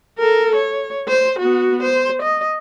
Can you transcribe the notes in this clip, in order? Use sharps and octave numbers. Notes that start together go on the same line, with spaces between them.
A4 A#4
C#5
C5
B3 F#4
C5
D#5